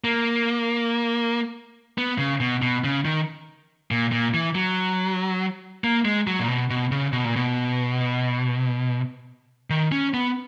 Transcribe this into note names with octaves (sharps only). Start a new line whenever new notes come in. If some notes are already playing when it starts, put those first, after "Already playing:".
A#3
B3
C#3
B2
B2
C#3
D#3
A#2
A#2
E3
F#3
A#3
G#3
F#3
A#2
B2
B2
C#3
B2
A#2
B2
D#3
C#4
B3